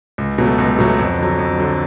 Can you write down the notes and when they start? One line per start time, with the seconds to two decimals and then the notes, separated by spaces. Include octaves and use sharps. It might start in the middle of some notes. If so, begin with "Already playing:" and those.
0.18 C#2
0.38 B2 F#3 A3
0.58 C#2
0.79 B2 F#3 A3
0.99 F2
1.19 D3 F#3
1.39 F2
1.59 D3 F#3